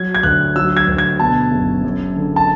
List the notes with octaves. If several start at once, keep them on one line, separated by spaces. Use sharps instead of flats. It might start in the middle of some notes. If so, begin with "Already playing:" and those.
Already playing: F#3 G#6
G#6
D2 F#6
F#3 E6
G#6
D2
G#6
B2 A5
F#1
F#2
D3
A5